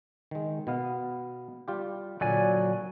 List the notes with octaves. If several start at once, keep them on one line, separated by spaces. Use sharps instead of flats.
D#3 G#3
B2 B3 F5
G3 F4 G4
A#2 D3 F#3 D5 G#5